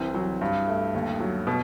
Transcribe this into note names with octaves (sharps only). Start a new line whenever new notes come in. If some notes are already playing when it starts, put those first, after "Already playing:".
Already playing: C2 E3 C4
F#3
G2
A3
D#2
F#3
B2